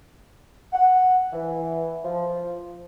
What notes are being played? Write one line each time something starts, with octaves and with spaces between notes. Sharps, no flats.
F#5
E3
F3